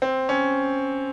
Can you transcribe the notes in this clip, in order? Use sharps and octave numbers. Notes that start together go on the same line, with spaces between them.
C4
C#4